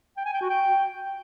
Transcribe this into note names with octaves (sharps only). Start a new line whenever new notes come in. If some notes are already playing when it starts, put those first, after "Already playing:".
G5
G#5
G5
F#4
G5